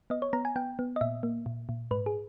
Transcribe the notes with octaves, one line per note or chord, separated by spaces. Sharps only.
B3 D#5
C#5
B3 A#5
G#5
B3 G5
B3
D#5
A#2 E5
A#3
A#2
A#2
G#2 B4
G#4